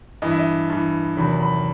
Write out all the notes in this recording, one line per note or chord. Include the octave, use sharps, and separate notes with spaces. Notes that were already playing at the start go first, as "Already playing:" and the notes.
G2 E3 D#5
E5
D#5
G2 E3
E2 C3 D#3 F#3 B5
B5